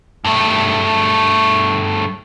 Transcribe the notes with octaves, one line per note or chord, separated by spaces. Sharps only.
G2 A3